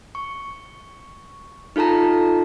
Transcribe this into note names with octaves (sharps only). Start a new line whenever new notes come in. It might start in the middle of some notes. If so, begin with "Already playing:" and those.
C#6
D#4 F4 A4 A5 A#5